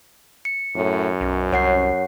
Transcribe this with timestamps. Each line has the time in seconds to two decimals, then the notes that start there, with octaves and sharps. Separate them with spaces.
0.45 C#7
0.76 F#2 A2
1.21 B1 C#4
1.52 C2 C#5 F#5 C7